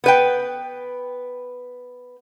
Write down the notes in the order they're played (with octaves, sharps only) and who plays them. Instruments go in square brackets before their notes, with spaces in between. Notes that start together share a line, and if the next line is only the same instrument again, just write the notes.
[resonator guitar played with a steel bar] B3 B4 G5